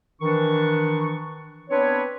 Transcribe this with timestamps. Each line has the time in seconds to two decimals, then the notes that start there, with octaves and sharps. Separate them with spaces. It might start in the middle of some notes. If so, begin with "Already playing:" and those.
0.21 D#3 E3 D4 C#6
1.70 B3 C4 D4 B4 C#5